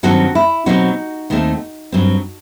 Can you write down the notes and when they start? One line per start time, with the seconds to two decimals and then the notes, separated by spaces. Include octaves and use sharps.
0.03 G2 D#3 F#3 C4 F#4 A4
0.35 E4
0.66 B2 F#3 C4 D#4 F#4
1.30 D#2 D#3 A3 C4
1.92 G2 F#3 C4